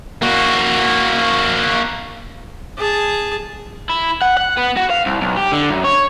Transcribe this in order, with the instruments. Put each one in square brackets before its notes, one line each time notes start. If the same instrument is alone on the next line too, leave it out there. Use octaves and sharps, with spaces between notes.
[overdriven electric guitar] A#3 F#4
[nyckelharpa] G#4 A5
[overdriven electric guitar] E4
F#5
F#5
B3
F#4
F5
C2
B1
G4
D3
F#2
C#5